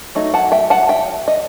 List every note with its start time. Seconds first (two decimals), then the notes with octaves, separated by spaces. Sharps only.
0.15 F#3 A3 D#4
0.34 F#5 A5
0.52 E5 G5
0.70 F#5 A5
0.89 E5 G5
1.28 D#5